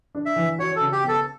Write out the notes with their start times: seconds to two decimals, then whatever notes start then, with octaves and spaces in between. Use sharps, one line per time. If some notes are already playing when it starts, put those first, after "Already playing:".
0.15 D4
0.25 E5
0.36 E3
0.59 F#4 C#5
0.76 C#3 A4
0.92 G4
1.04 B3 A4